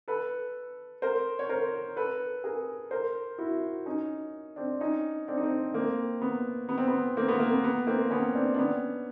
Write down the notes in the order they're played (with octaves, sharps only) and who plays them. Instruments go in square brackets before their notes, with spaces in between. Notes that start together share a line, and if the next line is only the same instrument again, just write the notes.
[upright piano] A4 B4
A#4 C5
C#5
A#4 C5
A4 B4
G#4 A#4
A#4 C5
E4 F#4
C#4 D#4
C4 D4
C#4 D#4
C4 D4
D#4
C4 D4
A#3 C4
B3
B3
C4
B3
A#3 C4
B3
A#3
B3
B3
A#3 C4
B3 C#4
C4 D4
D4
B3 C#4